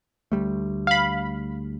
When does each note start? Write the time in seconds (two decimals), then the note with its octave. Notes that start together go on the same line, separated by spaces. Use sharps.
0.32 D2 G3 A3
0.87 F5 B5